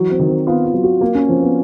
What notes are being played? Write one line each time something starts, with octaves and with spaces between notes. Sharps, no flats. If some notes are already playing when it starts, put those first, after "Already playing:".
Already playing: E3 F#3
C4
D#3
C4
B3 F4
F4
F#3
F#4
A#3 F4
C#4
F3 C4
B3